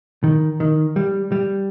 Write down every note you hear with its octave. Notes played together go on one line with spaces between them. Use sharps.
D#3
D#3
G3
G3